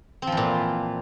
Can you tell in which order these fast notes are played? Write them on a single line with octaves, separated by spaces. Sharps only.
C4 F3 E3 A#2